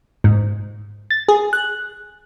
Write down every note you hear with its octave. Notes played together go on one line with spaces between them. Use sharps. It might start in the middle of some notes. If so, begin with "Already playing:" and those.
G#2
A6
G#4
F#6